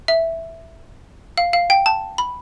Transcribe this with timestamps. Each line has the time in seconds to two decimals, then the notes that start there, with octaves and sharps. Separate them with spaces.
0.08 E5
1.38 F5
1.53 F5
1.70 G5
1.86 A5
2.18 B5